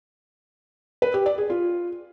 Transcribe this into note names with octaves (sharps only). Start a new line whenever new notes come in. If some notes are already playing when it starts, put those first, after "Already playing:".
B4
G4
D5
G#4
F4